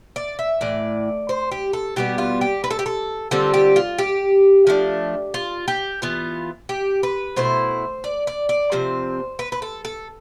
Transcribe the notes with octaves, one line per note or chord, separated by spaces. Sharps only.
D5
E5
A2 E3 D5
C5
G4
A4
B2 G3 B3 G4
F4
G4
B4
A4
G4
A4
D3 G3 C4 F4 A4
G4
F4
G4
F3 A3 D4
F4
G4
E3 B3 F4
G4
B4
B2 A3 E4 C5
D5
D5
D5
C3 F3 C4 C5
B4
B4
A4
A4